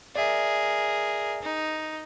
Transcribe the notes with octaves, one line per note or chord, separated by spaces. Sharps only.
G#4 A#4 D5 E5
D#4